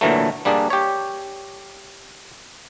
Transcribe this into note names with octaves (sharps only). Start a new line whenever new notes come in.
A#2 D3 E3 F#3 A3
G3 A#3 D4 G#4
G4 C#5